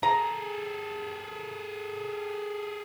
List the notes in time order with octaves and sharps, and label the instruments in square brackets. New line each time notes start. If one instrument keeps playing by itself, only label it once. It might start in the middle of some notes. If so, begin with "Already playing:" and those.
[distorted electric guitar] G#4 A4 [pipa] A#5